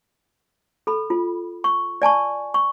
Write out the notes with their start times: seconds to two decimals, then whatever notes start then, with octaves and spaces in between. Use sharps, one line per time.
0.87 A4 B5
1.10 F4
1.64 C#6
2.02 D5 G#5 A5 C#6
2.54 C#6